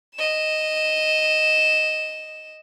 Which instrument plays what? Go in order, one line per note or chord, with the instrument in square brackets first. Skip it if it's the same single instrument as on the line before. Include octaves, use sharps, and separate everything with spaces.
[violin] D#5 E7